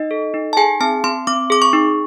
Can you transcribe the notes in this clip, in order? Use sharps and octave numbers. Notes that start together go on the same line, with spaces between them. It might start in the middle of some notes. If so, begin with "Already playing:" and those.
Already playing: D#4 D#5
A4
D#4
A5
G#4 G#5
C4 A5
C4 C6
C4 D6
G#4 D6
C#6
D#4